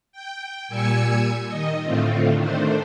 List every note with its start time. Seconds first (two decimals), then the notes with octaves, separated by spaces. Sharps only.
0.12 G5
0.69 A#2 G3 G#5 E6 G#6 C#7
1.47 D#3 D#5
1.83 A2 D3 A3 C4 F4
2.37 D#3 A3 D4 C5